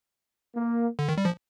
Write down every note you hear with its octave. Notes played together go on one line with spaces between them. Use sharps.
A#3
D3
D#3
G3
F3